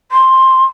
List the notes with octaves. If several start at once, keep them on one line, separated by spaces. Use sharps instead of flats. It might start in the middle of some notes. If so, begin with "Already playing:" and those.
C6